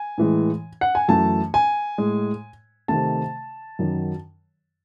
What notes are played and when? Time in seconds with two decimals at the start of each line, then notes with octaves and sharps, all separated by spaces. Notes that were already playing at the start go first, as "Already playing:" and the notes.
Already playing: G#5
0.18 A2 E3 G#3
0.81 F#5
0.95 G#5
1.08 F#2 E3 A3 A5
1.54 G#5
1.98 A2 G#3
2.88 C3 D#3 A3 A5
3.79 F#2 D#3 F#3